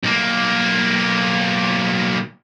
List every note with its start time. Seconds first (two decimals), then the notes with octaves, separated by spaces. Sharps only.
0.03 B1 A#3